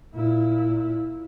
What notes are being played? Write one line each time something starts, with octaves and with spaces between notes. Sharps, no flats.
A#2 E4